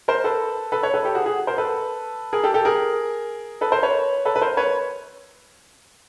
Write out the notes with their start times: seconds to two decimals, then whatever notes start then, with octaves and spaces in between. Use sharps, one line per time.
0.08 A#4 C5
0.24 A4 B4
0.72 A4 B4
0.83 B4 C#5
0.94 A4 B4
1.05 G4 A4
1.15 F#4 G#4
1.26 F#4 G#4
1.47 A#4 C5
1.58 A4 B4
2.33 G#4 A#4
2.44 G4 A4
2.54 G4 A4
2.65 G#4 A#4
3.61 A4 B4
3.72 A#4 C5
3.83 B4 C#5
4.25 A4 B4
4.36 B4
4.42 A#4 C5
4.57 B4 C#5